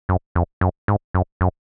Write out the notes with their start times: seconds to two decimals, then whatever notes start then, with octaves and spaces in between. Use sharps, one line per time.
0.09 F#2
0.35 F2
0.61 F#2
0.88 G#2
1.14 F#2
1.41 F#2